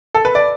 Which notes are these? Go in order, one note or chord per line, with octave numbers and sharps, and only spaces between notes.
A4
B4
D5